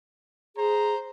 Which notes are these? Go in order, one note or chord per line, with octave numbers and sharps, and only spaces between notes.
G#4 C5 A#5